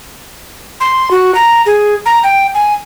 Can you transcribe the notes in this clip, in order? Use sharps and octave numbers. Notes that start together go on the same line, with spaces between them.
C6
F#4
A#5
G#4
A#5
G5
G#5